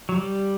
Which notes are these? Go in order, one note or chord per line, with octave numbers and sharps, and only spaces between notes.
F#3
G3